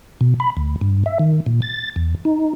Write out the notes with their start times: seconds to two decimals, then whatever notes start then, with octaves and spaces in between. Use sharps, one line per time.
0.21 B2
0.40 B5
0.57 D2
0.81 G2
1.06 E5
1.19 D#3
1.46 A#2
1.62 A6
1.96 E2
2.25 D#4